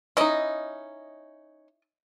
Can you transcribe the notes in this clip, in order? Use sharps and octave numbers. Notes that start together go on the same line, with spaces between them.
C#4 D#4 E4 D#5